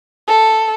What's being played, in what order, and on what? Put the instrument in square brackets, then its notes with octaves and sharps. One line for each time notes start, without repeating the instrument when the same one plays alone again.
[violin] A4